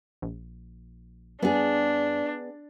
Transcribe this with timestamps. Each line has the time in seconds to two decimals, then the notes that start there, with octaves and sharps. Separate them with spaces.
0.22 A#1
1.42 G2 B3 D4 G#4